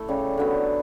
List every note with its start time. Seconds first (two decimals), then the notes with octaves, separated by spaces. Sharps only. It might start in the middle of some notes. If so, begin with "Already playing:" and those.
Already playing: A3 E4 A4
0.08 C#3 G3 C#4
0.38 D3 F#3 B3